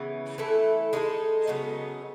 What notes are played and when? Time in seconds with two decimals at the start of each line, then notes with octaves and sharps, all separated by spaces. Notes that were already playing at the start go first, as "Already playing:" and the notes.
Already playing: C#3 E3 B3
0.38 E3 A3 E4 A4
0.93 G#3 D#4 F#4 A4
1.47 C#3 F#3 B3 D#4